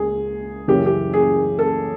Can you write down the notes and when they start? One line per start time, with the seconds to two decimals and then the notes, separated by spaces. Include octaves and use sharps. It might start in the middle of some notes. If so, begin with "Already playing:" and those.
Already playing: C#2 G#4
0.68 F#2 C#3 E3 G4
0.86 G4
1.13 G#4
1.59 A4